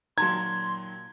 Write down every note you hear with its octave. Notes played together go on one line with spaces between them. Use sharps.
A#2 D#3 F#3 A5 A#5 C6 G#6